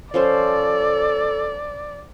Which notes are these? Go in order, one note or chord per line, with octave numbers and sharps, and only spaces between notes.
F3 C#4 A4 C5 D5